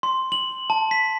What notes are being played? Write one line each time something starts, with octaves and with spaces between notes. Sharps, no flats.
C6
F#7
A5
B6